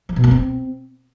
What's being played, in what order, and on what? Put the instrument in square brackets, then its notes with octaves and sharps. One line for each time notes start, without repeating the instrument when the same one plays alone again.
[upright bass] F3
B2
A#3
C4